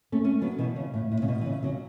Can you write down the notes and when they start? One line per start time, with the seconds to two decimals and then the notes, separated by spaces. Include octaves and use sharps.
0.12 A3 C#4
0.24 A3 C#4
0.42 F#3 B3
0.58 B2 E3
0.76 C#3
0.94 A2
1.12 A2
1.22 C#3
1.28 B2
1.41 E3
1.46 C#3
1.63 C#3 F#3